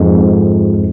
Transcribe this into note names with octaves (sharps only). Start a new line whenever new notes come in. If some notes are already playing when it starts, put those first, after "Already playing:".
Already playing: F2 G#2